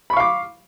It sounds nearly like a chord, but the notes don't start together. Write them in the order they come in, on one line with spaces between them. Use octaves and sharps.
B5 C#6 F5 D6